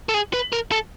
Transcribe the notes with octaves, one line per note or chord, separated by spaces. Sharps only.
A4
G#4
B4
A#4
A4